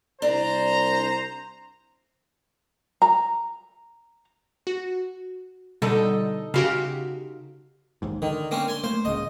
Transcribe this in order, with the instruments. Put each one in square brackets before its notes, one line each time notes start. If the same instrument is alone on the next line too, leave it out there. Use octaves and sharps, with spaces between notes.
[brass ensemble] C2 C5 A#5 [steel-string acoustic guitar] D4
[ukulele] A#5
[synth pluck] F#4
[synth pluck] B2 D3 G3 [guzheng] D#4 A4 D#5
[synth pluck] C#3 F#4 G4 [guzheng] F5 C6
[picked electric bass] A#1 D#2 G#2
[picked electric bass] D3 [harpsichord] D#3
[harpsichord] A#3 C4 C#4
G#5 C6
[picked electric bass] A3 A#3 [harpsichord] C5
[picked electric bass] D1 C#2 C#3 [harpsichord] D#5